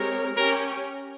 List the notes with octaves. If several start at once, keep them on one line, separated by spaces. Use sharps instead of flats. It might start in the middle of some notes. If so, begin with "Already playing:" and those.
Already playing: G#3 C4 G4 A#4 C#5
C#4 G4 A#4 C#5